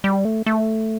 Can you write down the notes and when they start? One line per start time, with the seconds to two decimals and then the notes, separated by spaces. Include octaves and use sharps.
0.04 G3
0.25 A3
0.46 A3